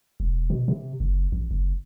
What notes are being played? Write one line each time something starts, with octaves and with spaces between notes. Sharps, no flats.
E1
B2
C3
F#1
A1
F#1